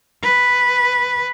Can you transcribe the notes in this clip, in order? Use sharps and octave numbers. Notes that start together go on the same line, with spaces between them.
B4